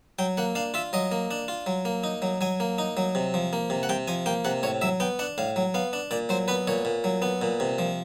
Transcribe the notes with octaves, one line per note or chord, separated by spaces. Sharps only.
F#3 G5
A#3 F#5
D4 F5
F4 E5
F#3 D#5
A#3
D4
F4
F#3
A#3
D#4
F#3
F#3 G#5
A#3
D#4
F#3
C3
F3
A#3
C3
F#5
C3 G5
F3 G#5
A#3 G5
C3 F#5
A2 C#5
F#3 E5
B3 G5
D4 F#5
A2 F5
F#3
B3 F5
D4
A#2 D5
F#3 C5
B3 B4
A#2 C#5
A#2
F#3
B3
A#2
C3
F3